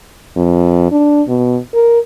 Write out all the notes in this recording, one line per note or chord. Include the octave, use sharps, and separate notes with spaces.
F2
D4
B2
A#4